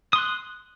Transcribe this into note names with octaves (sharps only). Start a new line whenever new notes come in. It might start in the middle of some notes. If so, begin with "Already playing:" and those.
C6 D#6 F#6